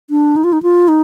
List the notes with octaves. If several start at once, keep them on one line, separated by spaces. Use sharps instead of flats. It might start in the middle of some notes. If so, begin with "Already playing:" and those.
D4
D#4
F4
D#4
F4
D#4